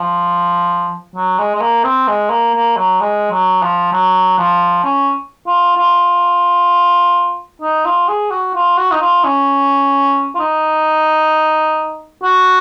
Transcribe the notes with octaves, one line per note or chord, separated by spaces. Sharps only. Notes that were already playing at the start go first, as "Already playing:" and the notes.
Already playing: F3
F#3
G#3
G#3
A#3
C4
G#3
A#3
A#3
F#3
G#3
F#3
F3
F#3
F3
C#4
F4
F4
D#4
F4
G#4
F#4
F4
F#4
D#4
F4
C#4
F4
D#4
F#4